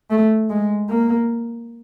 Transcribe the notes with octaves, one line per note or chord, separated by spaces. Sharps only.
A3
G#3
A#3